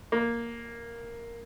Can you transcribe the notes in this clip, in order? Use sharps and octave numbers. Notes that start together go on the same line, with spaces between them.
A#3